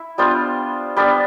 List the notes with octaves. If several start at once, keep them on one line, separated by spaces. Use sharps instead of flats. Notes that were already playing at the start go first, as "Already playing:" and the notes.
Already playing: E4
G3 B3 D4 F4 C5
G3 B3 D4 B4